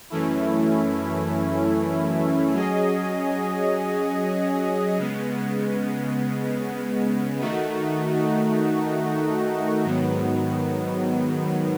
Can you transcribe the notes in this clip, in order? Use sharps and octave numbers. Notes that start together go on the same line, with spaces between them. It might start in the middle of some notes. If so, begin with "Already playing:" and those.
F#2 E3 A3 C#4 E4
F#3 C#4 G#4 D#5
C#3 G#3 B3
D#3 A3 D#4 F#4
G#2 D#3 F#3 B3